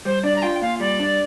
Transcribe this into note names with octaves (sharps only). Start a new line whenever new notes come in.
G3 C5
D4 D5
A#5
F4 G5
A#2 F5
G3 D5
D4